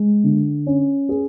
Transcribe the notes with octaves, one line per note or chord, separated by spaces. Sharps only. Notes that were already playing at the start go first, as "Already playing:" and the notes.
Already playing: G#3
D3
C#4
G#4